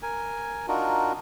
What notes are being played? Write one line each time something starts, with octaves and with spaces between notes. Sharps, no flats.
A#4 G#5
D4 D#4 F4 F#4 A#4